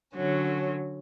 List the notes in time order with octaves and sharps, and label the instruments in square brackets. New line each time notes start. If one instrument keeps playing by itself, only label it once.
[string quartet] D3 F#3 C#4